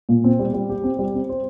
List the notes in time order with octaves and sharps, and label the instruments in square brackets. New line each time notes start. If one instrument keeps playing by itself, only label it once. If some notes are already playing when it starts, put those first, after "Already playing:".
[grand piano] A#2
C4
G3
G3
G4
C4
G3
C4
C5